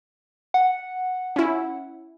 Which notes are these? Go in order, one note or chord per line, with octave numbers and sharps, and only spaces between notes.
F#5
C#4 E4